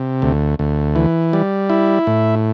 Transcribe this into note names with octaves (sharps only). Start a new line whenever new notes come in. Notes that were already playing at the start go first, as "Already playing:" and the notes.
Already playing: C3
D2
D2
E3
G3
E4
A2